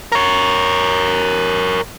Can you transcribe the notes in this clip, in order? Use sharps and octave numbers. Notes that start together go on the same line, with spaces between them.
A#4 C#5